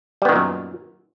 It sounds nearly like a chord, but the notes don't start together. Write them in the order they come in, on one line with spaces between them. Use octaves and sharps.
G3 B3 D#3 A#2 F#2